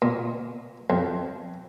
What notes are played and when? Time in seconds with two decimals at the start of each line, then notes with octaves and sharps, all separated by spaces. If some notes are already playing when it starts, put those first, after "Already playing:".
0.02 A#2
0.90 F2